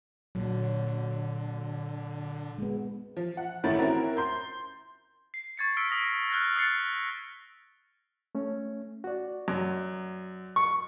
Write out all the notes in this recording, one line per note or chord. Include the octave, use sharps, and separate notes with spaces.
A#2 D3 F#3
G#3 B3
F3
F#5
A1 A2 D#3 A3 B5 A6
C4 C#4 E4 F#4 A#4
C6 G6
C7
C#6 G#6 A6 C7 C#7
E6 F6 B6 C#7 D7
D#6 A#6 C7
F6 F#6 G#6 A#6
D#6 F#6 A6 C7 C#7
A3 C#4
F#4 D5
F#2
C#6